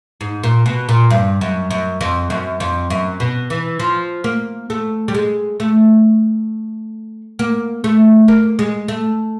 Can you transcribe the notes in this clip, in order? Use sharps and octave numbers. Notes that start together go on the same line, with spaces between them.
G#2
A#2
B2
A#2
G2
F#2
F#2
F2
F#2
F2
F#2
B2
E3
F3
A#3
A3
G3
G#3
A3
A#3
A3
A#3
G#3
A3